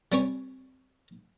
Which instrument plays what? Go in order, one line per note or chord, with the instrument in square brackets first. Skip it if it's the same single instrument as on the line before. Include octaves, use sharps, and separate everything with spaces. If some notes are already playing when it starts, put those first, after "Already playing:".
[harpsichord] G3 C4 C#4 C#5